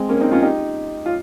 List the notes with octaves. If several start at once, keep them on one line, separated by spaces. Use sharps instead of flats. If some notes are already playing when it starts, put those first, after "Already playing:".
Already playing: G#3 C4
A#3 C#4
C4 D#4
C#4 F4
D#4 G4
F4